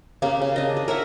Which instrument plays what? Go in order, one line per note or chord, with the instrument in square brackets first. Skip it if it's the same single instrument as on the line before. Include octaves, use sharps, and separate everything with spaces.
[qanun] C#3 A#3 G4
C#3
D4 D#5
G#4
A#4 C#5 E5 F#5